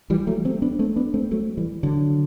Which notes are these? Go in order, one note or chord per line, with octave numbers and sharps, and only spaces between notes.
E3 G3
F#3 A3
A3 C4
B3 D4
A3 C4
B3 D4
A3 C4
F#3 A3
E3 G3
D3 F#3